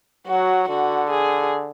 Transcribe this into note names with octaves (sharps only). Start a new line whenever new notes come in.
F#3 F#4
D3 F#4
G#4